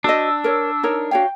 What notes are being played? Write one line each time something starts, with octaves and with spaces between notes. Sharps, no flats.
D4 F#4 C5 D#5 E6
A#4 C#5
D#4 A#4 C#5
F#4 C#5 F5 G5